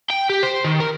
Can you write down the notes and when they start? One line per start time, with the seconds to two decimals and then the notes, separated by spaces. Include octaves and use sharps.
0.10 G5
0.30 G4
0.43 C5
0.65 D#3
0.80 A#4